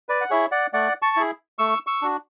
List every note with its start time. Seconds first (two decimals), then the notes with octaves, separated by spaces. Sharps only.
0.09 B4 D5
0.21 F#5
0.30 E4 G#4 C#5 E5
0.52 D5 F#5
0.73 A3 D5 F#5
1.02 A5 C#6
1.16 E4 G#4
1.59 A3 C#6 E6
1.87 C#6 E6
2.02 D4 F#4